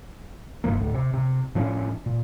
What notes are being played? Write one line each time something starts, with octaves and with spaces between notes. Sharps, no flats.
F1 G2 F3 A#3
D2 A2
C3
C3
A2 F3 C#4 D4
A#2